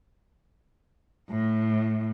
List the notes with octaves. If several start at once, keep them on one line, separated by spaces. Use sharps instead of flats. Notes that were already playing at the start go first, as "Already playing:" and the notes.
A2